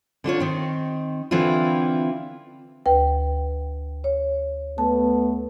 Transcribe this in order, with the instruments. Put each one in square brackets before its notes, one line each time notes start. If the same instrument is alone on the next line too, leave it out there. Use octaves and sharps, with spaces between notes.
[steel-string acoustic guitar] D3 D4 F4 C#5
D#3 C4
D3 E3 C4 D4 E4 F4
[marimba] D2 B4 G5
C#5
[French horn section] A3 B3 [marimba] A5